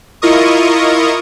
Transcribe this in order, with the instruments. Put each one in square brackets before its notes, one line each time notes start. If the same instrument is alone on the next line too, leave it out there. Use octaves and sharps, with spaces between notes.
[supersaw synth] E4 F4 A#4 D#5 C#6 D#6